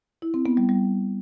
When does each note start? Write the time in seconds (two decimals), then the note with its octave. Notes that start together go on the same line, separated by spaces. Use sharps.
0.22 E4
0.34 C4
0.46 B3
0.57 G3
0.69 G3